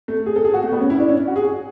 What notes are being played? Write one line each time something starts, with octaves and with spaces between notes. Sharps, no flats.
A3
G#4
A4
G#4
F#4
A3
B3
C#4
E4
D4
C#4
F#4
G#4